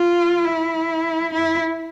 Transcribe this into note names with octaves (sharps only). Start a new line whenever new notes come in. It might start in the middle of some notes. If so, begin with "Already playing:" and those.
Already playing: F4
E4
E4